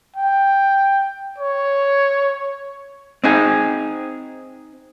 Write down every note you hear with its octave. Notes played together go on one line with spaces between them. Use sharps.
G5
C#5
C4 D#4 G#4